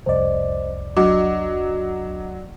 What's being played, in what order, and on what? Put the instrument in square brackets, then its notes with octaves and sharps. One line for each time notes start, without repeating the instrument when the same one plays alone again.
[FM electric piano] C2 F2 D5 [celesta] C5 D#5
[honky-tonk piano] F#3 [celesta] D4 D#5 D6